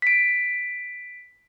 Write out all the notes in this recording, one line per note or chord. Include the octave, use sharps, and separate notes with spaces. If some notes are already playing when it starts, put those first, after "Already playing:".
B6 D7